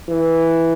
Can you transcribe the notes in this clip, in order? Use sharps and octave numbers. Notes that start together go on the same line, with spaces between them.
E3